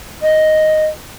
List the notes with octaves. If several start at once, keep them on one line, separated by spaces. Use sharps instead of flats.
D#5